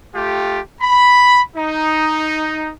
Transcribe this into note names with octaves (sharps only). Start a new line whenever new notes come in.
A3 F4 G4
B5
D#4